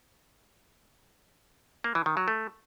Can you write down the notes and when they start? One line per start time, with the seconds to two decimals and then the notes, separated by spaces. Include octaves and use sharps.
1.84 A#3
1.95 E3
2.06 D#3
2.17 F#3
2.28 A3